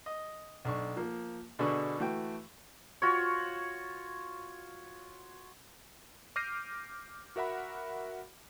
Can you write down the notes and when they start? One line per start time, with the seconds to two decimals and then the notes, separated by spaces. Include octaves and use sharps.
0.06 D#5
0.65 B1 D4 C#6
0.97 F3 A#3
1.59 B2 D3 D4 G#4 B5 C#6
1.99 E3 A3 F#4 G5
3.02 F4 F#4 C#5
6.36 D6 F6 G6 A#6 C7 D#7
7.36 F#4 A#4 E5 F#5 B5